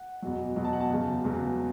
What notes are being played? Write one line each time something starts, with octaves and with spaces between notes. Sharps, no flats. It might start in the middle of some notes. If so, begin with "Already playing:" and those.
Already playing: F#5
E2 B2 F#3
E2 B2 F#3
A5
F#5
A5
E2 C#3 F#3
E2 C#3 F#3